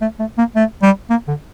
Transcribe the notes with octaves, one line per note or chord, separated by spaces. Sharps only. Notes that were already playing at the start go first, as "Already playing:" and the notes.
A3
A3
A#3
A3
G3
A#3
D3